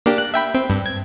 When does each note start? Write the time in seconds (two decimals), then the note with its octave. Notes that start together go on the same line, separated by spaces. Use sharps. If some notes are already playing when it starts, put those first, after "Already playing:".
0.06 A#3 D4 G4
0.18 F#6
0.34 E5 G5 B5
0.54 C4
0.70 G2
0.86 G#6